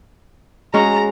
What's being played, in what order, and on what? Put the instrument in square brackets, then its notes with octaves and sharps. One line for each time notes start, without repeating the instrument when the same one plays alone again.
[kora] G#3 C#4 F#4 [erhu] A#5